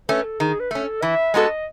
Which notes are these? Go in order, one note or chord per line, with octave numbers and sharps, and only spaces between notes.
A3 C#4 B4
A4
D#3 G#4
B4
A3 C#4 A4
E3 E5
G#3 B3 F#4 A4 D#5